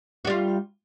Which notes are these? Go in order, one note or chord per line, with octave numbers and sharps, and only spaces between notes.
G3 F4 F#4